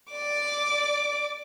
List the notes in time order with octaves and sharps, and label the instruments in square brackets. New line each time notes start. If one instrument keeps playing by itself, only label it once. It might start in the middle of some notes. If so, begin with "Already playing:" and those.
[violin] D5 D6